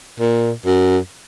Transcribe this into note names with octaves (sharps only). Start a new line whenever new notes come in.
A#2
F#2